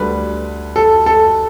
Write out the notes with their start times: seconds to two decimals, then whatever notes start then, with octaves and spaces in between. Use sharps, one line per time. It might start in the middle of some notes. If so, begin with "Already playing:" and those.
Already playing: D2 D3 G3 B4
0.76 A4
1.06 A4